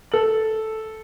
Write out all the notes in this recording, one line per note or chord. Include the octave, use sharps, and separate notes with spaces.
A4 F#7